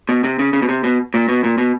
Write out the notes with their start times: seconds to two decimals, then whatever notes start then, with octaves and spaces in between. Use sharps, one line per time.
0.09 B2
0.24 C3
0.39 C#3
0.53 C#3
0.62 B2
0.69 C3
0.84 B2
1.14 A#2
1.29 B2
1.44 A#2
1.58 B2